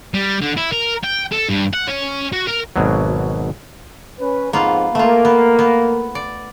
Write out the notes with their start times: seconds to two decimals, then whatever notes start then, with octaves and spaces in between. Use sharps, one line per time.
0.14 G3
0.42 D3
0.57 E4
0.72 A#4
1.04 G5
1.32 A4
1.50 G2
1.74 F#5
1.88 C#4
2.33 F#4
2.47 A#4
2.76 G#1 B2 F#3
4.21 C#4 B4
4.53 F2 G#2 A#3 B3 F4
4.95 A3 A#3 F4
5.25 B3
5.59 B3
6.15 D5